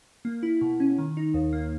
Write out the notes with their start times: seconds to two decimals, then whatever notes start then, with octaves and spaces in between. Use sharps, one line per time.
0.25 A#3
0.43 E4
0.61 B2
0.80 C#4
0.98 D#3
1.17 D#4
1.34 D#2
1.53 A#3